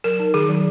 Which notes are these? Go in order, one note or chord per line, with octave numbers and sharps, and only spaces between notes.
F#3 A#4
D#4
D#3 G#4
F#3